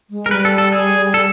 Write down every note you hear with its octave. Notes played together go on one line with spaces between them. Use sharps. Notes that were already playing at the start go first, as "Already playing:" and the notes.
G#3
A#4
G3 B4
A4
A4
G#4
A4